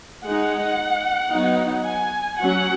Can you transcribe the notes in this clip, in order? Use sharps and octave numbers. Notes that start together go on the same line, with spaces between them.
G#3 D#4 F#5
F#3 B3 D#4
G#5
F#3 C#4 F#5